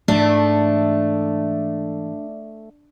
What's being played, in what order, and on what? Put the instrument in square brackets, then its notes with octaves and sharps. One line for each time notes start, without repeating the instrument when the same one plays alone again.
[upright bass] G#2 E3 [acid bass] A3 [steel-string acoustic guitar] D4